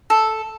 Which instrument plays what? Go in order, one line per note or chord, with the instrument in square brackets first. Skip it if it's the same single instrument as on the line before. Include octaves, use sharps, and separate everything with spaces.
[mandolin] A4